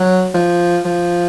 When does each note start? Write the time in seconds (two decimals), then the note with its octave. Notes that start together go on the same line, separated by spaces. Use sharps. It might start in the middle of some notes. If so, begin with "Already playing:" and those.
Already playing: F#3
0.34 F3
0.85 F3